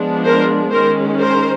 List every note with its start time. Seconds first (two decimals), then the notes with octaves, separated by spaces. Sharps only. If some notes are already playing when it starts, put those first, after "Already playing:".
Already playing: F3 G#3 B3 D4
0.26 A#4 C5
0.72 D#3 G#3 C#4 A#4 C5
1.18 A#4 C5